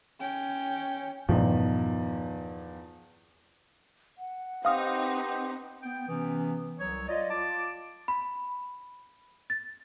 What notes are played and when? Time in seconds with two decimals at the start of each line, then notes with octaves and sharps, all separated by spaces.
0.20 C#4 G5
1.29 E2 G2 A#2 D#3 F3 A3
4.18 F#5
4.65 C4 D#4 G4 B4 C5 F5 D#6 F6
5.83 B3 G5
6.08 C3 E3 B3 C#4
6.79 C2 F#3 C#5
7.08 F4 D5 D#5
7.30 F4 A5 D6
8.08 B5
9.50 A6